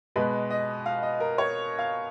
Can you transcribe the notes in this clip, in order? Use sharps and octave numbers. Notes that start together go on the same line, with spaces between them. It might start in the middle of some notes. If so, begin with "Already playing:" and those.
B2 G#3 B4
D#5
F5
D#5
A#4
C#5
F5